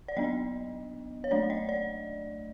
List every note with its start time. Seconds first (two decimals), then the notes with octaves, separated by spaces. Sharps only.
0.08 D5
0.17 F#3 B3 D4 D#5
1.24 C#5
1.31 F#3 A3 D4 D5
1.50 D#5
1.69 D5